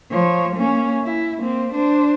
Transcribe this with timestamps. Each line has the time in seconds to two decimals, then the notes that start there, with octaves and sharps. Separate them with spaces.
0.11 F3 C#5
0.56 A#3 C#4
1.04 E4
1.38 A#3 C4
1.73 D4 C5